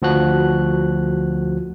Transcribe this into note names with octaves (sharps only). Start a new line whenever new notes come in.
D2 F3 F#4 F#6